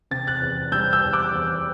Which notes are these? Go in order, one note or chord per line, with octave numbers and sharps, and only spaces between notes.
C3 A6
F#6 A6
E2
G3 E6 G6
E6 G6
E2
D6 F#6
E2